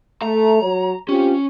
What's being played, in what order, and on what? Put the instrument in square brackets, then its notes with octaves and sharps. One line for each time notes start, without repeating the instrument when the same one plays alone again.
[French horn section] A3 [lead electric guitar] A#5
[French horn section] F#3 C#5
[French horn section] C4 F4 G4 [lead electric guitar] C#4